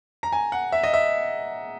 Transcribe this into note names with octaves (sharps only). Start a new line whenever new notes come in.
A#5
G#5
F#5
E5
D#5
E5